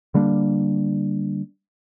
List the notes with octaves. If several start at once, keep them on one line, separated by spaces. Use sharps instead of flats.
D3 G3 A#3 D4